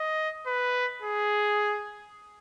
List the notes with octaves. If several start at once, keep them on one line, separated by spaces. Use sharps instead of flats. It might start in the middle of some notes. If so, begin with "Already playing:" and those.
Already playing: D#5
B4
G#4